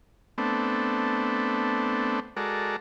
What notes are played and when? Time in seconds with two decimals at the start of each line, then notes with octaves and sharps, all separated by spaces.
0.38 A3 B3 C4 D4
2.37 G#3 F#4 A4 A#4 D5